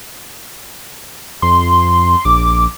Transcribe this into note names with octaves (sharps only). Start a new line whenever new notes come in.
F2 C6
A#1 D6